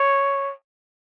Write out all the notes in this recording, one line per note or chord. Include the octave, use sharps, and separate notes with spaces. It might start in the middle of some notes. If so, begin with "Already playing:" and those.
Already playing: C#5